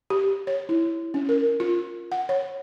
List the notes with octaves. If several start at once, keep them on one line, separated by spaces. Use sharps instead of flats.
G4
C#5
E4
C#4
A#4
F4
F#5
C#5